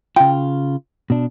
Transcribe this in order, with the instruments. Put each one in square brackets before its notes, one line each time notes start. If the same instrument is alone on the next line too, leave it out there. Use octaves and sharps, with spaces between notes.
[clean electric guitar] C#3 F4 [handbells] G5
[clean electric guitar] B2 D4